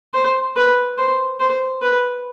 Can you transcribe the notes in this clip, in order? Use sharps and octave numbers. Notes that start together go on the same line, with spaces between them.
C5
B4
C5
C5
B4